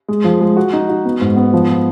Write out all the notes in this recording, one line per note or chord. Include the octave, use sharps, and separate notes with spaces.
G#3
F3
G#3
F#4
D#4
F#4
B3
G#2
B3
F3
F3